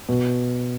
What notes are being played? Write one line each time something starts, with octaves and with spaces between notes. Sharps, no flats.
B2